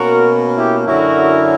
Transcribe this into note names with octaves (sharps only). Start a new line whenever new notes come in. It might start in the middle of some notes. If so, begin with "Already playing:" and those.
Already playing: B2 A#3 C#4 F#4 A#4
E4 G4
F#2 D3 F#3 C#4 E4 F#4 A#4